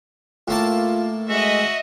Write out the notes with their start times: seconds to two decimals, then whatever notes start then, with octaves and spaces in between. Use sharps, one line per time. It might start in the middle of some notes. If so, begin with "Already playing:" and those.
0.48 A2 A#3 F4 A5
1.29 G#3 F#4 D#5 E5